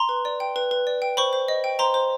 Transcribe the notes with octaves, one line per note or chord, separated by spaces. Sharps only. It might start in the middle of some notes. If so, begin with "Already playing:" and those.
Already playing: A#5 C6
B4
D5
G5
B4
B4
D5
G5
C5 B5 C#6
C5
D#5
G5
C5 A#5 C6
C5